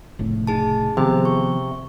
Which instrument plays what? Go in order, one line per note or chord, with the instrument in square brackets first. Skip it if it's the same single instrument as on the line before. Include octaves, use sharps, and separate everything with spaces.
[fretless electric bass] F1 A2 C#3
[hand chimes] D#4 G#4 A5
[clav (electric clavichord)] C3 [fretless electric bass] D#3 F3 B3 [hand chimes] G#4 E5
[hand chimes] C#6